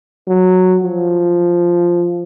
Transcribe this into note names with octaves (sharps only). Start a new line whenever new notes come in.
F#3
F3